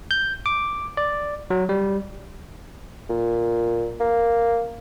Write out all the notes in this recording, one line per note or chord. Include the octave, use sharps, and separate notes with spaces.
G6
D6
D5
F#3
G3
A#2
A#3